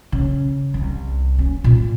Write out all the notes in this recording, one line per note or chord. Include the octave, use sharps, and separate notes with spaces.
C#3
C2
C#4
A#2